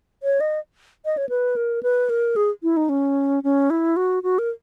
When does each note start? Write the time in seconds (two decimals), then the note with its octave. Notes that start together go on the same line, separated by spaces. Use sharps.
0.23 C#5
0.40 D#5
1.05 D#5
1.17 C#5
1.29 B4
1.56 A#4
1.83 B4
2.10 A#4
2.36 G#4
2.63 E4
2.77 D#4
2.89 C#4
3.44 C#4
3.70 E4
3.96 F#4
4.23 F#4
4.39 A#4